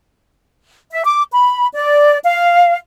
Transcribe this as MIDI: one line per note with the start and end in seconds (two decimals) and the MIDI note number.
0.91 1.03 76
1.05 1.22 86
1.32 1.67 83
1.75 2.18 74
2.24 2.78 77